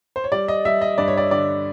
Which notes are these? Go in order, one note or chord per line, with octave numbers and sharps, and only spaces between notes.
C5
C#5
G3 D5
D#5
G3 E5
D#5
G2 D5
C#5
D5
D3 D5